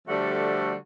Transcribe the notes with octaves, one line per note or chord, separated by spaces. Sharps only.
D3 F3 G3 A3 F#4 A4